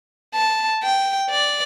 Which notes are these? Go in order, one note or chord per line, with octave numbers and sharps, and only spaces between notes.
A5
G5
D5